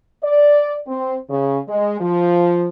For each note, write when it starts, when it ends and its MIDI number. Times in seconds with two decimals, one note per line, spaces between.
0.24 0.77 74
0.88 1.16 60
1.30 1.59 49
1.69 1.97 56
2.01 2.68 53